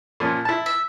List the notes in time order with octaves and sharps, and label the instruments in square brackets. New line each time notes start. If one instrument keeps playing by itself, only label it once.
[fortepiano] A#2 F3 C#4
E4 A5
[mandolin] E5